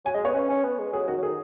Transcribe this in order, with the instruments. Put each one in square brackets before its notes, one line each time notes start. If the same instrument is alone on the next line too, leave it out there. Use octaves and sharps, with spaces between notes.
[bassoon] F#3 [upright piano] G#5
[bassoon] G#3 [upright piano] D#5
[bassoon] B3 [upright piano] C#5
[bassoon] C#4 [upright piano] B4
[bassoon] C#4
B3
G#3
[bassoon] F#3 [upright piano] G#4
[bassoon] D#3 [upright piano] F#4
[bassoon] F#3
[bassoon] D#3 [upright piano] G#4